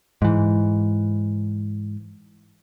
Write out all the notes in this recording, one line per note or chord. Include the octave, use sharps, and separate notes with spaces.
G#2 E3